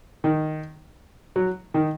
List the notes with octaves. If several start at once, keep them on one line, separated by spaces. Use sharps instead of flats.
D#3
F#3
D#3